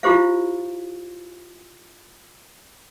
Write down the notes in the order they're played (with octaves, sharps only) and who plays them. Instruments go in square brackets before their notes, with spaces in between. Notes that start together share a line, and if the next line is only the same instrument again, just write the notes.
[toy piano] E4 F4 G4 C5 F5